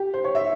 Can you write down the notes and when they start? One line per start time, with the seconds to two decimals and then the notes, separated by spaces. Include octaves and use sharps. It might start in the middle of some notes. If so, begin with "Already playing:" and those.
Already playing: G4
0.14 C5
0.24 C#5
0.35 E5